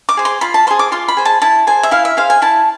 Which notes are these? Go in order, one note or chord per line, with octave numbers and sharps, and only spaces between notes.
D6
G#4 C5
C6
F4 B5
A5
G#4 C5 C6
D6
F4 C6
B5
G#4 C5
A5
E4 A5
G#4 C5 G#5
E5
E4 F5
E5
G#4 C5 F5
G#5
E4 A5